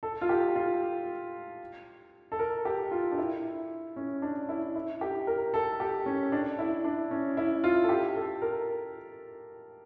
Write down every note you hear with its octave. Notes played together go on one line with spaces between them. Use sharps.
A4
F4
G4
F4
A4
A#4
G4
F4
D4
E4
C#4
D4
E4
E4
G4
A#4
A4
G4
C#4
D4
E4
D4
C#4
E4
F4
A4
G4
A4
A#4